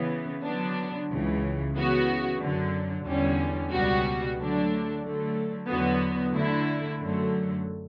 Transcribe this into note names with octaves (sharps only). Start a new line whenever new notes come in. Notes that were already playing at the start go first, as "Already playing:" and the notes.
Already playing: C#3 E3 B3
D3 F#3 B3 D4
C#2 C#3 E3
C#3 E3 B3 F#4
F#2 D3 F#3
E2 D3 G3 C#4
C#2 B2 G3 B3 F#4
D3 F#3 A3 D4
D3 F#3 A3
E2 D3 F#3 B3 F#4
D3 A3 E4
F#2 D3 F#3 A3